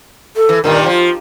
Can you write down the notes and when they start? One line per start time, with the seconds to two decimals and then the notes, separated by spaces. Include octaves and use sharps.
0.37 A4
0.49 E3
0.64 G2 A#2 D#3 A#4
0.86 F3 F4